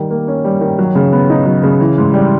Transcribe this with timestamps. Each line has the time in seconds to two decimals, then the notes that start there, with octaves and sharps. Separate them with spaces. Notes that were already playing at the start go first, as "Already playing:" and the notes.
Already playing: D#3 G3
0.10 A#3
0.28 C#4
0.44 G3
0.61 D#3
0.79 F#3
0.95 C#3
1.13 B3
1.30 D#4
1.46 F#3
1.63 C#3
1.80 E3
1.98 G#2
2.14 G3